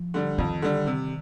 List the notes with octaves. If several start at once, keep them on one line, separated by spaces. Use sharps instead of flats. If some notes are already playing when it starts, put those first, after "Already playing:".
Already playing: F3
D3 G3
F2 D#3
D3 G3
C3